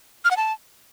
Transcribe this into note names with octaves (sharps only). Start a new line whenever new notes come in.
F6
F#5
A5